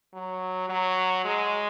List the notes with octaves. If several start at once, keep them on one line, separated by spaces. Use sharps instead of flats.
F#3
F#3
G#3